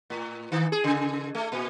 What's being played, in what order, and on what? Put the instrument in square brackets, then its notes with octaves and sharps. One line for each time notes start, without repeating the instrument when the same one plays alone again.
[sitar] A2
D#3
G#4
C#3
A3
A#2